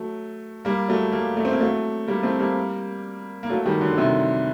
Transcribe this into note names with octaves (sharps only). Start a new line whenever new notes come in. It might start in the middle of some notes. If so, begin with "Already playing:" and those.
Already playing: F#3 A3
G3 A#3
F#3 A3
G3 A#3
F#3 A3
C4
A#3
F#3 A3
G3 A#3
A3 C4
G3 A#3
A#3
F#3 A3
D#3 G3
D3 F#3
F#3
C3 D#3